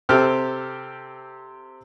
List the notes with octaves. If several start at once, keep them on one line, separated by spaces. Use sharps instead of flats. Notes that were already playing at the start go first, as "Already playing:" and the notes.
C3 C4 G4 A4 F6